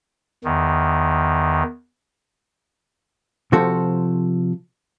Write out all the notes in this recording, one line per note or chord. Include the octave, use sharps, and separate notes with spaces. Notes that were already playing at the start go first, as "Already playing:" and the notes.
E2 D#3
C3 F3 F#4 A4 C5